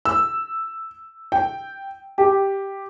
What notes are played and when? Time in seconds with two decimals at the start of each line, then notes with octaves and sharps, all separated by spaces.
0.05 E6
1.32 G5
2.18 G4